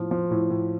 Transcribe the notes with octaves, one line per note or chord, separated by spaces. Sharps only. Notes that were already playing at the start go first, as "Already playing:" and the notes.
Already playing: A2 F3
F3
A2
A2